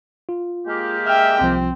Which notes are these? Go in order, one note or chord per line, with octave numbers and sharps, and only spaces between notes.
F4
G#3 A#3 G4
E5 G5 F6
C2 F3 C4